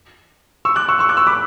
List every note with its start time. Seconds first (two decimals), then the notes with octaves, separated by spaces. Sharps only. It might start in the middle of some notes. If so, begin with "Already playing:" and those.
0.65 C#6 E6
0.76 D6 F#6
0.89 C#6 E6
0.99 C#6 E6
1.09 D6 F#6
1.17 C#6 E6
1.27 B5 D6